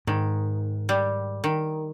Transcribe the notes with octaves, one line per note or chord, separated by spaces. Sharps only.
G#2 D#3
G3
D#3